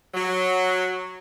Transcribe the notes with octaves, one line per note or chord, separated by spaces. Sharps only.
F#3